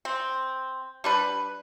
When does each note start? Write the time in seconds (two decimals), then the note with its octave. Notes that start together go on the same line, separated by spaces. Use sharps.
0.05 C4
1.04 G3 D4 B4